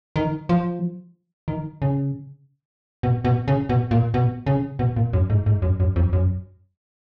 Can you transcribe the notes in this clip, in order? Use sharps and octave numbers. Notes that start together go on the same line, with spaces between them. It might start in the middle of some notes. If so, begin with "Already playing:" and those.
D#3
F3
D#3
C#3
B2
B2
C#3
B2
A#2
B2
C#3
B2
A#2
F#2
G#2
G#2
F#2
F#2
F2
F#2